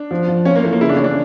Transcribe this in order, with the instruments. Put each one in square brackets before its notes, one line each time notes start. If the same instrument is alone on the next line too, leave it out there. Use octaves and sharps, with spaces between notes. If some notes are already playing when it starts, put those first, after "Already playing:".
Already playing: [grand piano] D4
[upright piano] F3
F3
[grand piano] C#4 [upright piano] F4
[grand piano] A#3
[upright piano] E3 [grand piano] A3
[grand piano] A#3
[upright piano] C#3 [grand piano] E4
[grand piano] D4
[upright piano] C#3 [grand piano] C#4
[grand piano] D4